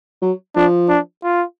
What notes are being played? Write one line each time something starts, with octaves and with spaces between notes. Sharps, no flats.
F#3
F3 D4
D4
F4